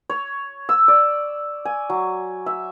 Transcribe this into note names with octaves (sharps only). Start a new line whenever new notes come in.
C#5
E6
D5
G#5
F#3
E5